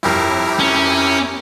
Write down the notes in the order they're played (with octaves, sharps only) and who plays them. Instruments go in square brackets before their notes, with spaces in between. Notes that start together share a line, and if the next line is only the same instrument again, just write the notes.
[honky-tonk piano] G1 F2 [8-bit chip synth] E4 G4 A#4
[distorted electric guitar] C#4